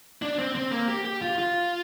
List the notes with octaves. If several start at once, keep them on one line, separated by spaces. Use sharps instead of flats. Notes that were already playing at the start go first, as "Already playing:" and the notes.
D4
C4
C4
A#3
G4
G4
F4
F4